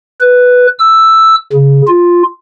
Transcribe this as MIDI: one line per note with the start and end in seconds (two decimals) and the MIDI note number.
0.21 0.67 71
0.79 1.35 88
1.53 1.82 49
1.88 2.23 65